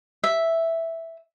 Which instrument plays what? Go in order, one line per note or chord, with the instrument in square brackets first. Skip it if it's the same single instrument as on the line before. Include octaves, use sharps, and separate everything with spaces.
[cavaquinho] E5